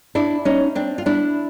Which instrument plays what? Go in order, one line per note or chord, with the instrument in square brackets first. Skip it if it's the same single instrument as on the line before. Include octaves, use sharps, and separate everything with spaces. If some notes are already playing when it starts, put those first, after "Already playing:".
[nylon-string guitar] D4 E4
C#4 D#4
C4 D4
F4
D4 E4